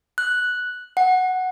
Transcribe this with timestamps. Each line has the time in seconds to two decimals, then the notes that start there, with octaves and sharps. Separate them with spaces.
0.18 F#6
0.97 F#5